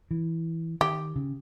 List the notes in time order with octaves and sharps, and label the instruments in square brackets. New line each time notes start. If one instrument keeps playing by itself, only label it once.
[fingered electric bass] E3
[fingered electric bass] D#3 [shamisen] G4
[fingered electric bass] C#3